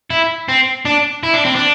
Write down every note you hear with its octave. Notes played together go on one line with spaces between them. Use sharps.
E4
C4
D4
E4
D4
C4
D4